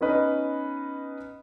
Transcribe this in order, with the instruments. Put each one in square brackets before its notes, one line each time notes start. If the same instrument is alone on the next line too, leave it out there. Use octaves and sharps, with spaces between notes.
[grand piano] B3 C#4 D#4 B4 D#5